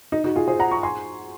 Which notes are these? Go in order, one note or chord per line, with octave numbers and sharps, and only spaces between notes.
D#4
D#4 F#4
F4 G#4
G#4 C5
F#5 A#5
A#5 C#6
G#5 C6